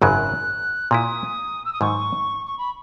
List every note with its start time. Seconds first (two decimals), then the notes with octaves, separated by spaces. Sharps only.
0.01 G#1 F#2 C#3 F#3 F#6
0.91 A#2 A#3 E4 D#6
1.65 E6
1.72 D#6
1.81 G#2 D#3 F#3 C#6
2.46 C#6
2.58 B5